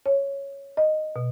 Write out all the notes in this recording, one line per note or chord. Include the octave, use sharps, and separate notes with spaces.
C#5
D#5
B2